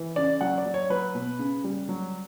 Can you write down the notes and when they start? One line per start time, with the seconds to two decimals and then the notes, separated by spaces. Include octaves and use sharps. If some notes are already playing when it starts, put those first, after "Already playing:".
Already playing: E3
0.16 C#3 D5
0.41 F#3 F#5
0.58 D5
0.66 F#3
0.74 C#5
0.90 F#3 B4
1.15 B2
1.39 C#3
1.64 G3
1.89 F#3